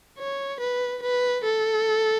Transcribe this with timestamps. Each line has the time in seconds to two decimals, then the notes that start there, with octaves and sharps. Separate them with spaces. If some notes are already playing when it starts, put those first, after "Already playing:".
0.18 C#5
0.60 B4
1.02 B4
1.44 A4